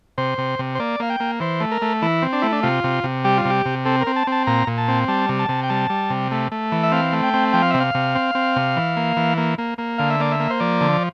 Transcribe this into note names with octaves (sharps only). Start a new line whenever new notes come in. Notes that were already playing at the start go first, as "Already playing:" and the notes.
C3 C5
C3
C3
C5
A#3 D5
A#3 F5
G5
A#3
E3 C5
A3
A#4
A3
E3 E4
C4
D4
A3 E4
D4
C3 F4
C3
C3
G3 G4
F4
C3
G4
C3
C4 A4
A#4
C4
A5
C4 A5
A#2 A#5
A#2
A5
C4
G3 A5
C3
A5
C3
G5
G3 A5
G3
C3
A3
A3
E3
E5
C4 F5
A3
G5
C4
F3 G5
F5
E5
C3
F5
C3
C4
C4
C3
E3
A#3
E3
A#3
A#3
A#3
D3 F5
E5
A#3 D5
E5
A#3
C5
F3 D5
D3